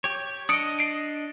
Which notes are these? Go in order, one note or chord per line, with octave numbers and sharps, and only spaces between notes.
G4 C#5
D4 D#5 D#6 C#7 D7
C7 D7